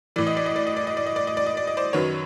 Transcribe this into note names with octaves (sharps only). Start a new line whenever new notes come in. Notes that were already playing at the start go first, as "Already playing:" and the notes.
A2 E3 D5
D#5
D5
D#5
D5
D#5
D5
D#5
D5
D#5
D5
D#5
D5
D#5
D5
D#5
C5 D5
F#2 D#3 F#3 B4 C#5